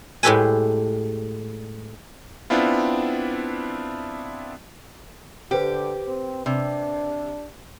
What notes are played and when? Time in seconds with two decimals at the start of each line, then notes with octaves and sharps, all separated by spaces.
0.23 A2 G#3 G4 A4 B4 G#5
2.50 B3 C4 D4 E4 F4
5.51 D3 G4 B4 C5 G5
6.07 C4
6.46 C3 D4